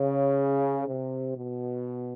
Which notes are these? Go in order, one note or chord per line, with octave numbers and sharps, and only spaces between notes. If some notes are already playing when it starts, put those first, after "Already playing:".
Already playing: C#3
C3
B2